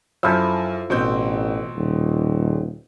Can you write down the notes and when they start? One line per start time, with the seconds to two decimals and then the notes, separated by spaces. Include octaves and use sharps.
0.23 F#2 F3 E4 A4 E6
0.90 A1 B2 C4 G6
1.76 D#1